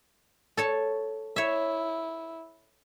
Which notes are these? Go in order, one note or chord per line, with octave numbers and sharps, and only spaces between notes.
A4 C#5 A5
E4 C#5 E5